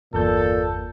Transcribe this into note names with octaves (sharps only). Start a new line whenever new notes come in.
G1 E2 A#2 A4 G6